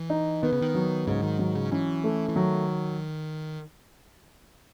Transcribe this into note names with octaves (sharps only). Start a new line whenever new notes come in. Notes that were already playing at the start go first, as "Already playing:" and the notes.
Already playing: E3
D#4
D#3 B3
C#3
D#3
F#3
G#2 C#3
D#3
D#3 F#3
C#3
E3 C#4
A3
E3
D#3 F#3